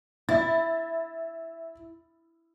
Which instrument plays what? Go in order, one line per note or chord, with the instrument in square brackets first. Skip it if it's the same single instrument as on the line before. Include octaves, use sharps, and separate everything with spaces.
[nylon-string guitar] E4 [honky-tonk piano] E5 A6